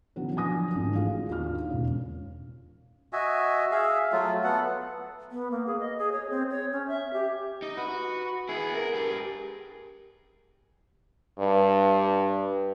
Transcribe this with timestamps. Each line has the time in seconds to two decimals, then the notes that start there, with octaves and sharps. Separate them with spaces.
0.16 D3 E3 F#3 B3 C#4
0.35 F3 F#3 D4 G#5 D#6 A#6
0.75 G#1 D3 E3 A3
0.95 F4 F#4 G#4 F5
1.29 D#2 D4 F4 F5 F6
1.70 E1 C#4
3.13 F#4 D#5 E5 G#5
3.71 G#4 E5 F5
4.12 F#3 A3 F4
4.44 B3 A4 F#5
5.32 B3
5.51 A#3
5.66 G#4
5.79 D#5
5.98 G#4
6.12 C#5
6.30 C4
6.50 C#5
6.72 C#4
6.88 E5
7.13 G4
7.62 D#4
7.77 F#4 B4
8.49 B3 E4 G#4
8.75 A#4
8.94 G4 B4
11.39 G2